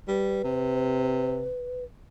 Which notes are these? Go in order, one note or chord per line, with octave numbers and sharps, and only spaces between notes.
G3 B4
C3